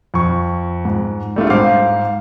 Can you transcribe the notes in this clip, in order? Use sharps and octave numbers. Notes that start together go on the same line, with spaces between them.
F2 C#6
G#2
G3 A3 D4 F4
G#2 C5 F5 D6